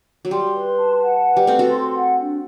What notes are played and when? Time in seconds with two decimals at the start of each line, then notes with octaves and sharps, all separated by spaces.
0.25 F#3
0.31 G3 C6
0.55 B4
0.78 A5
1.01 F#5
1.25 B4
1.37 G3
1.47 A3 C4 B4
1.59 F#4 A4
1.71 C6
1.94 F#5
2.18 D4